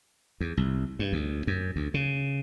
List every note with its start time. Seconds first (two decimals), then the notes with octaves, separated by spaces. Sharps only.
0.40 E2
0.57 C2
0.99 G2
1.13 D2
1.47 F#2
1.76 D2
1.94 C#3